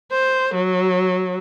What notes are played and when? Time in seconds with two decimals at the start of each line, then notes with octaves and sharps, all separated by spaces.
0.11 C5
0.54 F#3